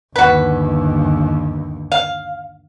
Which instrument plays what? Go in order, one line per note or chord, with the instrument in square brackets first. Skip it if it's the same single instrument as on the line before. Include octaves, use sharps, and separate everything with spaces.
[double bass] G1 D#2 [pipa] F#4 B4
[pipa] F5